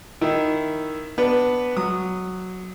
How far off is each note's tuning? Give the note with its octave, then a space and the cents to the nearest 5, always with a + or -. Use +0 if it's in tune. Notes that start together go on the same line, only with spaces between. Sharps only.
D#3 +0 E4 +0
B3 +0 D4 +0 B4 +0
F#3 +0 D#6 -15